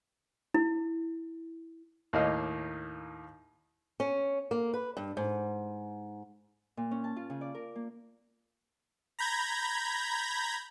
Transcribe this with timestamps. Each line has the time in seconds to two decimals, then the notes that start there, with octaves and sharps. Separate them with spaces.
0.54 E4
2.13 D#2 A2 A#3 D#4 D#5 F5
4.00 C#4
4.51 A#3
4.74 B4
4.97 G2
5.17 G#2
6.77 A#2
6.91 C#4
7.04 A5
7.16 F4
7.30 C#3
7.41 D5
7.55 A#4
7.75 A#3
9.19 A#5 B5 G6 G#6 A#6